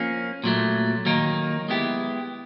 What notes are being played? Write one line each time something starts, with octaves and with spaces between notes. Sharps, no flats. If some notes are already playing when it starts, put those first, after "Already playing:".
Already playing: F3 A#3 C#4
A#2 F#3 A3
D#3 F#3 A#3 D#4
G#3 B3 E4 G4